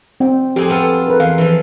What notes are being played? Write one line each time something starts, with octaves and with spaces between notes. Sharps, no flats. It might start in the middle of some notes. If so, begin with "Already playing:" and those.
C4 G5
F2 C4 G4 G#4
B3 F4 A4
G#4 A#4 B4
E2 F5
E3 F3